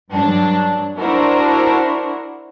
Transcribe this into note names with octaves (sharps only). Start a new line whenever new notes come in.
G2 F#3 D4
D4 E4 F#4 A#4 C5